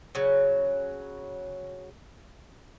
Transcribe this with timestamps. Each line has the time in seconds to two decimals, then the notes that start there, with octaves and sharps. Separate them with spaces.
0.15 C#3 F#3